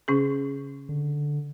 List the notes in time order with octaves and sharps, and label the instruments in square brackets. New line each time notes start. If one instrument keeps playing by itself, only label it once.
[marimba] C#3 C#4 G#4
[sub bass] D3